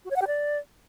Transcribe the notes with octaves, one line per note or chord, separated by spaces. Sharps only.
F#4
C#5
F#5
G4
D5